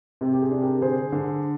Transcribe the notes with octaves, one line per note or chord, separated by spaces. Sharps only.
C3 G4
G4
G#4
D4
G4 A#4
D3 G#4 C5
D3